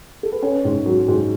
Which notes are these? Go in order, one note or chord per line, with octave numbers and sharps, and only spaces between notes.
A4
B4
C#4 C#5
G#2
F#3
G#2